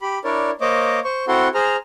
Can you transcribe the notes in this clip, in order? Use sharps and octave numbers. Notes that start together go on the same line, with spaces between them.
G4 B5
D4 E4 A#4 C#5 D5
A#3 C5 C#5 D#5 D6
C5 C#6
C4 E4 F#4 A4 F#5 C6
G#4 C5 A#5 F6